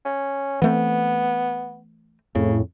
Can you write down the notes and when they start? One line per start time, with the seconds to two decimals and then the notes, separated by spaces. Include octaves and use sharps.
0.05 C#4
0.62 E3 A3 B3 C4
2.35 F2 A2 C#3